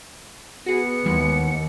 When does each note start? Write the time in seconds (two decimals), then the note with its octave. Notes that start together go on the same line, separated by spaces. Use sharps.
0.66 B3 F#4 G#4 C#7
1.06 D#2 E3 G3 G#3